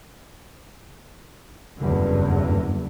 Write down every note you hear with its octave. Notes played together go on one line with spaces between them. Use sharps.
F#1 E2 G2 D3